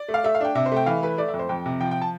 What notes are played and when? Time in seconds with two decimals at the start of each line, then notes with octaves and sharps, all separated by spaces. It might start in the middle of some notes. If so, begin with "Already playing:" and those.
Already playing: D5
0.08 A3
0.14 F5
0.24 A3 E5
0.35 F5
0.41 D4 G5
0.55 C3 E5
0.66 C5
0.72 A3 G5
0.86 E3 F5
1.02 A3 B4
1.18 A3 D5
1.28 E5
1.34 F2
1.39 C5
1.49 F2 G5
1.66 C3
1.81 F3 G5
1.91 G5
2.02 A5